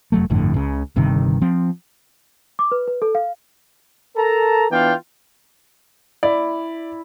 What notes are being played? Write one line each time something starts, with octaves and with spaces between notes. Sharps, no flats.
F1 F#3 A3
G1 F2 A2 D3
C#2 C#3
G1 G2 C3 D#3
F3 C4
D6
B4
B4
A4
F5
A4 A#4 A5 A#5
E3 B3 D4 F4 F5 G5
E4 D5